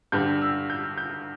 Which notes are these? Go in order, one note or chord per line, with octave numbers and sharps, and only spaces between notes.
G2 D3 G3 D4 G6
E6
G6
G6